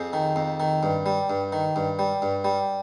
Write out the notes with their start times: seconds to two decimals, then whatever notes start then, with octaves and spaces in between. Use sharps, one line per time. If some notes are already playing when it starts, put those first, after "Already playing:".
Already playing: F2 G#4 C5
0.13 D#3
0.36 F2
0.60 D#3
0.83 G2
1.06 G3
1.30 G2
1.53 D#3
1.76 G2
1.99 G3
2.22 G2
2.44 G3